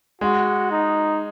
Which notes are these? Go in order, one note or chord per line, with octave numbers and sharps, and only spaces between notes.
G#3 F#4
D#4